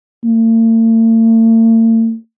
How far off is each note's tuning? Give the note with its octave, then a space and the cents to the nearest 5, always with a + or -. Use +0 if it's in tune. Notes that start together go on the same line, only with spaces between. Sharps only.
A3 +45